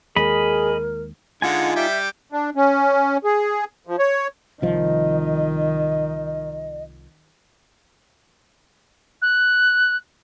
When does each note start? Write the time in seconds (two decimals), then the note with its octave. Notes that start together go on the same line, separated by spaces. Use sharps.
0.16 D#2 G#3 G#4 A#4 D#5 B5
1.42 D3 G#3 D#4 F4 F#5 G#5
1.76 G3 G4 E5 D6
2.32 D4
2.55 C#4
3.24 G#4
3.87 F3
3.99 C#5
4.62 C2 D#3 F3 D#5
9.22 F#6